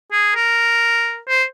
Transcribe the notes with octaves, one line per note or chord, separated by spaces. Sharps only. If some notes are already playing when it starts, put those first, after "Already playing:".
G#4
A#4
C5